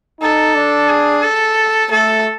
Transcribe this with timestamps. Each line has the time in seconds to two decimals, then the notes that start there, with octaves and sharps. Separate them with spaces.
0.21 D#4 A4
0.55 D4
0.89 G#4
1.23 A4
1.91 A3 A4